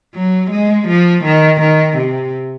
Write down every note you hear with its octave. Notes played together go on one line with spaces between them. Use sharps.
F#3
G#3
F3
D#3
D#3
C3